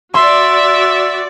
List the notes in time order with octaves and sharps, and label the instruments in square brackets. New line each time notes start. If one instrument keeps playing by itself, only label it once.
[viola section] F#4 D5 [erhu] E5 [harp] C6